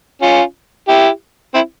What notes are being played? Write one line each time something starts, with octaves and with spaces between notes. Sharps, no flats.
C#4 F4
E4 G4
C4 E4